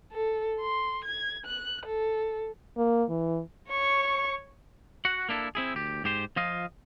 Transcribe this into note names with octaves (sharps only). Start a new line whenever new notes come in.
A4
C6
G#6
F#6
A4
A#3
E3
C#5 C#6
F#4 F#5
A#3 D4 E4 A4
C4 E4 G#4
D2 G4
G#2 G4 C5
F3 F4 D#5 F5